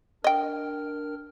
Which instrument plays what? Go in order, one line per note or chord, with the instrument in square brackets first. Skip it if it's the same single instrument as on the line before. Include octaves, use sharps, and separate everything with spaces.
[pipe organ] D4 A#4 F6 [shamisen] D#5 G5